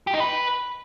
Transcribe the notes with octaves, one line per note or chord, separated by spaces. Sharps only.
G4
D#4
B4